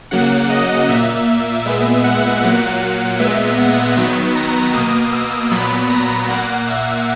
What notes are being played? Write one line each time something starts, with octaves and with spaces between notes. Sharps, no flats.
C#3 F#3 A#3 F#5
D#5
A#2 A#3 E5
A#2 G#3 B3
F#5
A#2 F#3 A#3 F#5
A#2 G#3 B3 E5
F#5
D#3 F#3 B3
A#5
B2 A#3 D#6
E6
A#2 F#3 B3 B5
A#5
A#2 A#3 F#5
E5